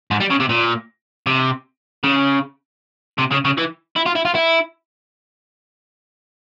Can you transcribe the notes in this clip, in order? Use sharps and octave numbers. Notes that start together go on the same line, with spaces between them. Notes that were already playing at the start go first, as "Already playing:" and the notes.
G#2
G3
C#3
C3
A#2
C3
C#3
C3
C#3
C#3
E3
E4
F4
E4
F4
E4